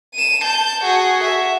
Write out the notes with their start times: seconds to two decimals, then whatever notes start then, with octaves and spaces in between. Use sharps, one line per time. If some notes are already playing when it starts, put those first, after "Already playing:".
0.14 D#7 E7
0.44 A5 G6
0.84 F#4 G#4
1.24 E5